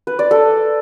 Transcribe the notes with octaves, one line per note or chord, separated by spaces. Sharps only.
B4
D5
A4